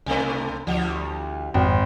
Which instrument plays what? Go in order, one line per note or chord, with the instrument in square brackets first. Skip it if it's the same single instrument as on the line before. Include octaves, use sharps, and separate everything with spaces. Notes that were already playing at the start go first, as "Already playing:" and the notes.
[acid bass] C2 [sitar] B2 A3 B4
[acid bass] D2 [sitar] E3 G3 G4
[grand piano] G#1 [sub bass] F2